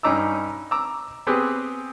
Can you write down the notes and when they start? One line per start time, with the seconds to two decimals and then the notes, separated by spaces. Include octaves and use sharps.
0.03 G2 C#4 D#4 A#5 D6 E6
0.71 A#5 D6 E6
1.27 B3 C4 G4 G#4 B4